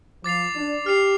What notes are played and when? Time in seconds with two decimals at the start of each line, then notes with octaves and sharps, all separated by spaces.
0.24 F3 D6 A6 C7 F7
0.55 D4
0.86 G4 F6 C7 F7